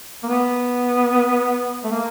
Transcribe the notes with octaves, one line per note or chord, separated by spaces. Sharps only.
A#3
B3
A3
A#3